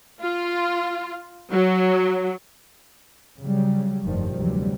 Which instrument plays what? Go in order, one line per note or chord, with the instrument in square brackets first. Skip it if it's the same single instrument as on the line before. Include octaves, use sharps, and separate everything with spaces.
[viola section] F4
F#3
[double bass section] C#3 F#3 G3
F1 G2 D#3 F3 G3
F1 D2 C3 E3 F#3 G3